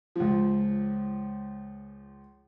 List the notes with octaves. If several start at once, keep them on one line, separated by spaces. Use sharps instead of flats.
C#2 F3